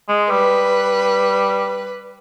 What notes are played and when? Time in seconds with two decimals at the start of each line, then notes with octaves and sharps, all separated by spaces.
0.09 G#3
0.31 G3 B4